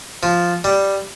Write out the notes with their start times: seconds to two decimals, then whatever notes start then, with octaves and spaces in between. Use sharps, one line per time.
0.23 F3
0.64 G3